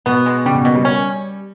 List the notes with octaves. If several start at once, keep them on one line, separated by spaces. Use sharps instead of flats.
B2 B3
G#3
C#3 G3
B2
B2 A#3
G3
C#4